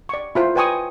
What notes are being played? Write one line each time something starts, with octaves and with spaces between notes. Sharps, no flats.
D5 C#6
E4 F4 C5
B4 D5 G5 G#5 C#6 D#6